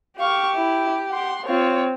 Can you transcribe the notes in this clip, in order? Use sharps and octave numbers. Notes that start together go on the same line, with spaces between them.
G4 F5 C#6
E4
F#5 C6
C4 F4 C#5